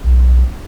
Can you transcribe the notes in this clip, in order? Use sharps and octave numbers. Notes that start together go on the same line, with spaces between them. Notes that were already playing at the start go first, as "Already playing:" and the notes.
B1